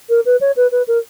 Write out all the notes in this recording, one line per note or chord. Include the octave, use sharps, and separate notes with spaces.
A#4
B4
C#5
B4
B4
A#4